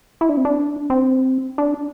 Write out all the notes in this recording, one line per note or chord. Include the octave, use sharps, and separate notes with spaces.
E4
D4
C4
D4
C4
D4